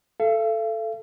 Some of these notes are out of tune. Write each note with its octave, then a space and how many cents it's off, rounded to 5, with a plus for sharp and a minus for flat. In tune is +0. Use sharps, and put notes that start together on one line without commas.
A4 +0 F5 -45